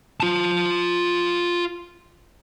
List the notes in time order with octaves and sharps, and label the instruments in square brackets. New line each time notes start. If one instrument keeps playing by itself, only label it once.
[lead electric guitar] F4 A5